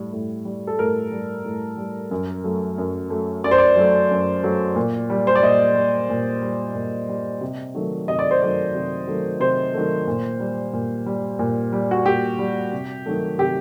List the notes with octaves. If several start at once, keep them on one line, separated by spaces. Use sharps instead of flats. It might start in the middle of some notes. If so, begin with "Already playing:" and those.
Already playing: A2 G3
A2
G3
A4
A2 A#4
G3
A2
G3
F#2
F#3 A3
F#2
F#3 A3
F#2 D5
C5
D5
F#3 A3
F#2
F#3 A3
A#2
G3
C5
D5
A#2 D#5
G3
A#2
G3
A#2
G3
C3
D#3 F#3 A3
C3 D#5
D5
C5
D#3 F#3 A3 D5
C3
D#3 F#3 A3
C3 C5
D#3 F#3 A3
A#2
G3
A#2
G3
A#2
G3
F#4
A#2 G4
G3
C3
D#3 F#3 A3
C3 G4